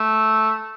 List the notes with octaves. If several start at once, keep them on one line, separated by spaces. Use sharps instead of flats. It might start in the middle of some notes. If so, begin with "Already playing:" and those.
Already playing: A3